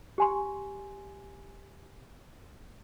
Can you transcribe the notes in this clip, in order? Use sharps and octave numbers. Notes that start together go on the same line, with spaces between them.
G4 G#5 C6